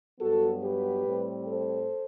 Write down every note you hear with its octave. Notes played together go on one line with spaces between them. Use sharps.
G2 F#3 B3 F#4 A4
G4 B4
A2 G3 C4
A4 C5